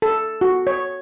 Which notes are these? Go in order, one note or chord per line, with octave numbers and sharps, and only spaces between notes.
A4
F#4
C#5